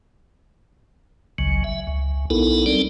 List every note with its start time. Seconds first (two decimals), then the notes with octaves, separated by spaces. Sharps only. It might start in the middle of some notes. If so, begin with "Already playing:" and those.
1.38 G#1 C#2 C#3 F#3
1.64 E5
1.87 C#2
2.30 B1 B3 D#4 E4 A4 A#4
2.66 G3 C4 D4 D#4 A4 D5